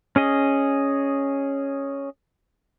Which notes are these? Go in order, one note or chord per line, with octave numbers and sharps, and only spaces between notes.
C#4 G#4 D#5